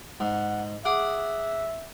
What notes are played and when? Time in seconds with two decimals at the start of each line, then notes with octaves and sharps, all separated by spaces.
0.20 G#2 F#5
0.85 G#4 E5 F#5 D6